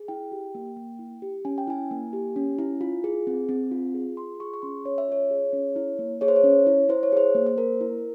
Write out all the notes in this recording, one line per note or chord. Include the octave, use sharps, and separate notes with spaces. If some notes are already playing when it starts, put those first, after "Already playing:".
Already playing: G#4
E4 G5
G4
A#3
A#3
E4
G4
C#4 G#5
G5
E4 G#5
A#3
G4
C#4
E4
F4
G#4
C4
C4
F4
G#4
F4 C6
G#4 C#6
C#6
C#4 C6
C#4 C#5
E5
F4 C#5
G#4
C#4
E4
A#3
G#4 C#5
C5
C#5
C#4
E4
E4 C5
C#5
G#4 C5
A#3
C5
A#3 A#4
E4